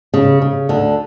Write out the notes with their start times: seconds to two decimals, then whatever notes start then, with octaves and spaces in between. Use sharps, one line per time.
0.14 C#3
0.42 C#3
0.69 D2 D3